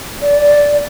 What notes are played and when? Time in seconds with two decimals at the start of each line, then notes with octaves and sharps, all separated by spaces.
0.21 D5